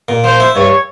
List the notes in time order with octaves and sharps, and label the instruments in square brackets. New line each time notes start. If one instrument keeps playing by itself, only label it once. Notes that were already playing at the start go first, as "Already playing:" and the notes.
[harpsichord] A#2
[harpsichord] F3 [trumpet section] C5
[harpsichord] E4
[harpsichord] G2 [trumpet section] C#5